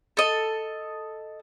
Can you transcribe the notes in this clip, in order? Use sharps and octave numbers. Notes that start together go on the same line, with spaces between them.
A4 D#5